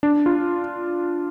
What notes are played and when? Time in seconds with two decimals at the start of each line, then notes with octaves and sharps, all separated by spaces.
0.03 D4
0.26 F4